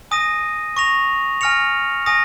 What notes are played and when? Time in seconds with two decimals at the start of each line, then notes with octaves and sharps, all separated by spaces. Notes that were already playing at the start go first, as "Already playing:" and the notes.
0.11 G#5 D#6 A#6 D#7
0.77 C#6 A#6 F7
1.41 G#5 F6 A#6 C#7 F7
2.06 G#5 D#6 A#6